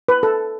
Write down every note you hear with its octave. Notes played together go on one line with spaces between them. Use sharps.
B4
A4